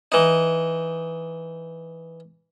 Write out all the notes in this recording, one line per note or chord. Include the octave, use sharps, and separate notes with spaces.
E3 D#4